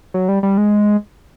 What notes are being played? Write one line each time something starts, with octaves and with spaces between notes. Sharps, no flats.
F#3
G3
G3
G#3